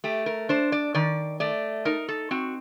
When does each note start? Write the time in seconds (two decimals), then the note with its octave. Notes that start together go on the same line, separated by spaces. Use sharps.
0.04 A3 G4
0.26 A#4
0.49 D4 C5
0.72 D5
0.95 D#3 D5
1.40 A3 D5
1.85 D#4 A#4
2.09 A4
2.31 C4 F#4